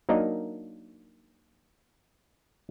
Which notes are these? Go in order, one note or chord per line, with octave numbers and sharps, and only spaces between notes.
F#3 A#3 D4 D#4 A#4 D#5